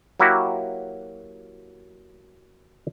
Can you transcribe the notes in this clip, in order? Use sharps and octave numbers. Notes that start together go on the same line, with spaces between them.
F#3 A#3 E4 F#4 G4